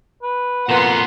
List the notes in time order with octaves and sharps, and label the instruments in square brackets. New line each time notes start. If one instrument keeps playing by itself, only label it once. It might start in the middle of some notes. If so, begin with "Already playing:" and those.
[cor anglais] B4
[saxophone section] F2 B4 [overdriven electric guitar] A#2 B3 [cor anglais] A#4 [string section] F#5 C6